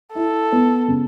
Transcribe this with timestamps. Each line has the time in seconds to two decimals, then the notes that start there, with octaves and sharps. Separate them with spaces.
0.14 E4 A4
0.52 B3
0.88 C#3